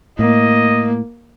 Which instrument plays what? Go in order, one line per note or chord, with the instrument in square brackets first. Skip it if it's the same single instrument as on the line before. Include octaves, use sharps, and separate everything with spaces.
[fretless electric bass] A2 [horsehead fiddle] A#3 [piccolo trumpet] D#5